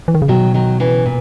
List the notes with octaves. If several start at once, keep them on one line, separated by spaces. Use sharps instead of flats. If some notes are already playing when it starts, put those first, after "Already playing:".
E3
D#3
C#3
B2 D#3 F#3
D#3 F#3
C#3 E3
A#2